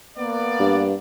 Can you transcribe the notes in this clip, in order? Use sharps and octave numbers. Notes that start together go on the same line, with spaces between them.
A#3 B3 D5
G2